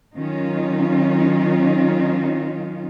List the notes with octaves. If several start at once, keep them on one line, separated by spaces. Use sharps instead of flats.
D#3 F#3 C#4 D#4 F4